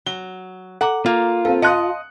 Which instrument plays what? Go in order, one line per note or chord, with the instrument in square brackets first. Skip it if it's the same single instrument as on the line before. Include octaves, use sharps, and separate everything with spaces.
[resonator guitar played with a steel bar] F#3 [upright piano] G7
[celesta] A4 A#5 D6 [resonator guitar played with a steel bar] F#5
[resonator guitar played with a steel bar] A#3 [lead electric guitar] F4
[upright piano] C4 A4 [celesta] F5
[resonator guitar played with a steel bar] D#5 [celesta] F5 A5 C6 [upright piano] D#6 F#6 C#7